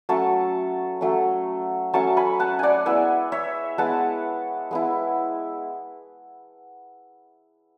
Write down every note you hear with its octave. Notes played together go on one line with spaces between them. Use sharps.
F#3 A3 C#4 A5 C#6
F#3 A3 C#4
F#3 A3 C#4 A5 C#6
G#5 B5
F#5 A5
D5 F#5 G#5
G#3 B3 E4 E5 G#5
C#5 E5
G#3 B3 E4 F#5 A5
G#3 B3 E4